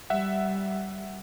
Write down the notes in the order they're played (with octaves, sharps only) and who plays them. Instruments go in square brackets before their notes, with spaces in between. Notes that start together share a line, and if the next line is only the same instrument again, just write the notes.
[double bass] G3 [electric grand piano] E5 F#5